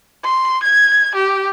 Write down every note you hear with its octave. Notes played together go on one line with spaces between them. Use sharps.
C6
G#6
G4